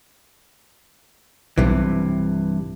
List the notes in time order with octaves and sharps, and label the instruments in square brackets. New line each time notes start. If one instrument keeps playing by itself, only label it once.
[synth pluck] B1 [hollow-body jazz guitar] G2 C3 E3